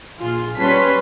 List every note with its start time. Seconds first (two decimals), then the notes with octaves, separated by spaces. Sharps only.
0.20 A#1 F4 G#4
0.58 G3 C#4 B4 A5 C6 B6